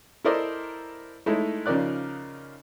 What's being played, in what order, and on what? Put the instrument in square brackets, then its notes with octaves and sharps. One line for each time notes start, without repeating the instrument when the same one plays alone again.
[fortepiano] E4 A4 A#4 C5 D5 D#5
G#3 A3 D#4 E4
C#3 F3 D#4 A#4 D5 F#6